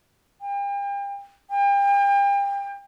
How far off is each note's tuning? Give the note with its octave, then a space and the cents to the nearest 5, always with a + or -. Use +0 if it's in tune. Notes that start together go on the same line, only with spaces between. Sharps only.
G5 +40
G5 +35